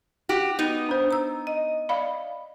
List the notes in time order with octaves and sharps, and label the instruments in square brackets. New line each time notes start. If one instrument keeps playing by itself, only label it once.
[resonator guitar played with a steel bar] F#4 G4
B3 D#4
[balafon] D4 C5
[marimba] A#5 E6
D#5
[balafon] D5 F5 B5